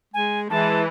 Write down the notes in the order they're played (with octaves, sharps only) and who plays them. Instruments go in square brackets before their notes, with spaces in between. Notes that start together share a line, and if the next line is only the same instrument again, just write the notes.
[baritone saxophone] G#3 [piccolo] G#5
[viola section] E3 [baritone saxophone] G#3 [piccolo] A5